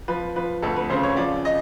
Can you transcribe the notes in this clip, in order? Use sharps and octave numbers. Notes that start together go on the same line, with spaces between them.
F3 B4
F3 B4
D2 A4
B4
C#3 C5
C#5
F3 D5
D#5